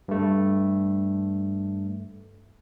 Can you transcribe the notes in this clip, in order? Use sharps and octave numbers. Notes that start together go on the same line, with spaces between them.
G2 A3